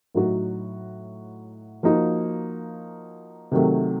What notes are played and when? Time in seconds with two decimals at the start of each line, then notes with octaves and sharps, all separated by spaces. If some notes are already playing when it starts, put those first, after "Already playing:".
0.14 A2 F#3 A3 D#4 F#4
1.83 F3 A#3 D#4 F#4
3.52 C3 D#3 F#3 A3